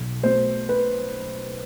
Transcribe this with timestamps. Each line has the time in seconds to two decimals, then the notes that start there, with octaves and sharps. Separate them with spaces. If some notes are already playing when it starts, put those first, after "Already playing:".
Already playing: B1
0.23 B2 A3 C5
0.69 B4